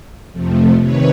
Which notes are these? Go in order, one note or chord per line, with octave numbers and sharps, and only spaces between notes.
F2 C3 F3 A3
C3 D#3 B4 C#5